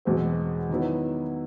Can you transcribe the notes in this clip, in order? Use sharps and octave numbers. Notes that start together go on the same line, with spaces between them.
E2 B2 G#3 C4
D#3 F#3 B3 E4